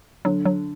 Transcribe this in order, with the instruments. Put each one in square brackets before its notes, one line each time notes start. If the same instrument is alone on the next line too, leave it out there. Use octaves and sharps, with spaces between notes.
[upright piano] D3 [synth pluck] F#3
[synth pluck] F#3